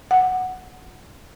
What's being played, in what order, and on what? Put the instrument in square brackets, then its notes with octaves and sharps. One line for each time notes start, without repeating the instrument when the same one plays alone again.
[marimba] F#5